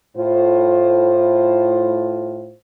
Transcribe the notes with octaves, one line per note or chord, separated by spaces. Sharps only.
A2 F4 C5